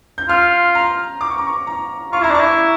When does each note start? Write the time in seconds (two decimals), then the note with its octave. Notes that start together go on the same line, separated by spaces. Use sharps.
0.18 G6
0.29 F4 F6
0.75 A#5
1.21 D6
1.30 C#6
1.38 A#5
1.47 C#6
1.67 A#5
2.13 F4 C#6
2.21 E4 A#5
2.30 D4
2.35 E4 C#6